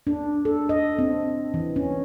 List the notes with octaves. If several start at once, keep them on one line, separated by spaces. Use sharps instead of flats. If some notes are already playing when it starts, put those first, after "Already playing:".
D4
A4
D#5
C4
E3
C#4